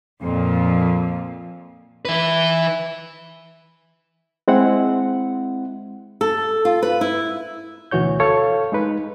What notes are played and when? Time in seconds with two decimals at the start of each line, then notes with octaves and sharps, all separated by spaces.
0.20 F2 A#2
2.05 E3 B4
4.48 G#3 C4 E4 F#5
6.21 A4
6.65 F4
6.83 B4
7.01 E4
7.91 D2 B2 E3 F#4 C#5 G6
8.20 A4 C#5 F5
8.72 G#3 D#4 B4